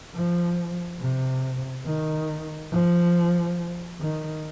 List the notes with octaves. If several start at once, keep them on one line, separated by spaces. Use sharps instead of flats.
F3
C3
D#3
F3
D#3